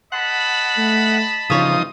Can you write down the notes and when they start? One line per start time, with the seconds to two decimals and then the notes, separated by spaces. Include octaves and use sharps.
0.12 D#5 F#5 A5 B5
0.77 A3
1.50 G#1 G2 C#3 E3 F3 D#4 C#5 D#6